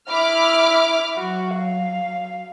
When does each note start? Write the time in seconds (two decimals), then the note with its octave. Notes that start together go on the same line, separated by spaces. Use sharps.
0.10 E4 B5 D6 F6
1.17 F#3 F#4
1.55 F5